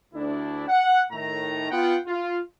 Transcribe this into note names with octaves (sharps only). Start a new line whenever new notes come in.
D2 D4 E4
F#5
A2 D#3 A3 A#5
B3 F4 F#5 G5
F4